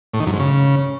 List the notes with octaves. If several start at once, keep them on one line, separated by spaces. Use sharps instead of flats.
A2
D#3
F#2
G#2
C#3